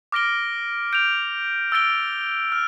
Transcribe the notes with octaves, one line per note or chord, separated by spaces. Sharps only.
D6 F6 A#6 D7 G7
G6 D7 F7
E6 A6 D7 G7
F6